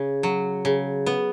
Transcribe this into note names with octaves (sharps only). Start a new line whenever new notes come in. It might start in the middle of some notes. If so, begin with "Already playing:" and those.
Already playing: C#3
F#3
C#3
B3